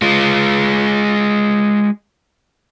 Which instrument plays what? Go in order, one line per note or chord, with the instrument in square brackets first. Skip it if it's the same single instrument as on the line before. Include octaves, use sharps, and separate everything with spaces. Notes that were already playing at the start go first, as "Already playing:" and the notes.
[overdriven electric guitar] G#3 F4